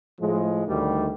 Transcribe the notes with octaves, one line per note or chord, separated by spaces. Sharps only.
A2 F3 G#3
D2 D#3 G3